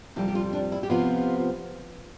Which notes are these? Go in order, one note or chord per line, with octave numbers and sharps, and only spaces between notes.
F2 C3 G3 E4
G4
F4
D4
E4
G4
C3 F3 B3 F4